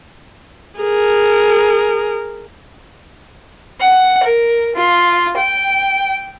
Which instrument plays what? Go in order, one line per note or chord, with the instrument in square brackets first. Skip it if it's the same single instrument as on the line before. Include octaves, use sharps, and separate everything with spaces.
[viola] G#4 A#4
[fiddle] F#5
A#4
F4
G5